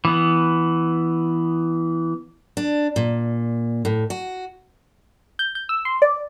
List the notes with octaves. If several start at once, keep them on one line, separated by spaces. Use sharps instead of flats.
E3 B3
D4
A#2
A2
F#4
G6
G6
E6
C6
D5